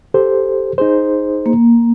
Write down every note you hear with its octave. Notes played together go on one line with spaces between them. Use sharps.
G4 A4 C5
D#4 G#4 C5
A#3